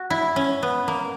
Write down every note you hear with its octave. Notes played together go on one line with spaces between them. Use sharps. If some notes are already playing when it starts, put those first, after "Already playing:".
Already playing: F#4
E4
C#4
B3
A#3